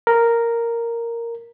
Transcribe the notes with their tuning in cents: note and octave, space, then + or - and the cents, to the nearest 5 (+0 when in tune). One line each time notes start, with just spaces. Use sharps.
A#4 -5